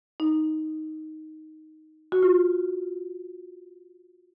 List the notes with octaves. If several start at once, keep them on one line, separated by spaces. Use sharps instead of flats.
D#4
F#4
F4